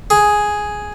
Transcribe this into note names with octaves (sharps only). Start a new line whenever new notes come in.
G#4